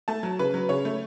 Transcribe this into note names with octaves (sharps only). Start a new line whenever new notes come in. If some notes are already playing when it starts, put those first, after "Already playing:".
A3 A5
F#3
C#3 B4
F#3
C#3 C#5
A3